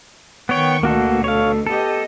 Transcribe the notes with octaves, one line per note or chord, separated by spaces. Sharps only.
D#3 B3 C#5 G5 C#6
D2 B2 A#3 F#4 A4
A4 C#5 F5
B3 G4 A4 D#5